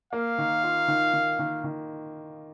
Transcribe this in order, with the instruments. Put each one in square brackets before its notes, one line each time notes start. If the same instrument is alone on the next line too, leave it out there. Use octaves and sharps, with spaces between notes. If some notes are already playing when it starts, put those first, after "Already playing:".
[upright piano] A#3 [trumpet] F5
[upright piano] D#3
F4
D#3
D#3
D#3
D#3